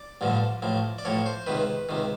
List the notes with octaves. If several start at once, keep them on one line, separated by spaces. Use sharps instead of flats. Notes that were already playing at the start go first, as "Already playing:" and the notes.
Already playing: D5
A1 G2 D3 F3
A1 A2 F3
D5
A1 A2 F3 C#5
C5
C#2 C3 D#3 B4
C#2 C3 D#3